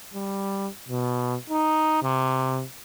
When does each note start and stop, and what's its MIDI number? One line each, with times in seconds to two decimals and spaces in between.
0.14 0.67 55
0.88 1.35 47
1.50 2.01 63
2.03 2.64 48